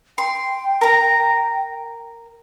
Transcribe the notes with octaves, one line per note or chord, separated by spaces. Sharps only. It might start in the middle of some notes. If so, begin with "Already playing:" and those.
G5 C6
A#4 A#5